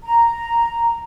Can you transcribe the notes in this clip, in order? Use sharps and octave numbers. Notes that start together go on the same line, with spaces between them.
A#5